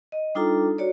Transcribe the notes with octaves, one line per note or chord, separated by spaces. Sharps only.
D#5
G3 D4 D#4 F4 A4 A#5
F#4 C#5 D5